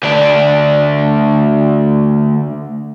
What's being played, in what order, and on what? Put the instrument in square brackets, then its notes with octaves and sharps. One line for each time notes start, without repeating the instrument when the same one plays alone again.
[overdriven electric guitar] D2 D4